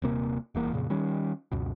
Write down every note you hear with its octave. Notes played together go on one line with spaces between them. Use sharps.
D#1 C3 A#3
D#1 E2 A#3
F2 A#2 C#3
D#3 G3 C#4
C#2 F#2 B2